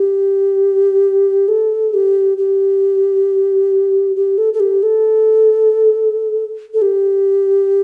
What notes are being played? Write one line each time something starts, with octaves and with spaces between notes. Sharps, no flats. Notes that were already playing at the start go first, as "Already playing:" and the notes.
Already playing: G4
A4
G4
G4
G4
A4
A4
G4
A4
A4
G4